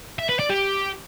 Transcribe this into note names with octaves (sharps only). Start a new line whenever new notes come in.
E5
B4
D5
G4